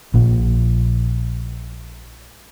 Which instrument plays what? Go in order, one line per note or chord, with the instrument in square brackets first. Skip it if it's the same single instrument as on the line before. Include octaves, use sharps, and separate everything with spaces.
[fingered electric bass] A#1 A#2